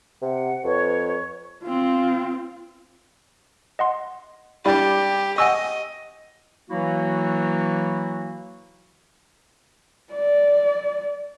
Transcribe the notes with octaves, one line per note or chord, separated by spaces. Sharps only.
C3 F#5
F2 B4 C#5 C#6
C4 F4
D#5 F#5 C6
G3 D4 E4 G4
D#5 F#5 G#5 C#6 E6
E3 F#3 A#3 E4 F#4
D5